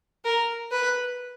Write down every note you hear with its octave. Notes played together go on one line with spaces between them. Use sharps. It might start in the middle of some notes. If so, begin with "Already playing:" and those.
A#4
B4